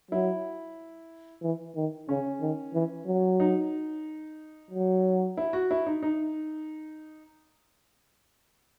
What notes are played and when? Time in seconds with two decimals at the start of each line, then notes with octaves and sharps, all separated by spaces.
0.11 F#3 E4
1.42 E3
1.76 D#3
2.09 C#3 C#4
2.41 D#3
2.74 E3
3.07 F#3
3.40 D#4
4.71 F#3
5.37 E4
5.53 F#4
5.71 E4
5.87 D#4
6.03 D#4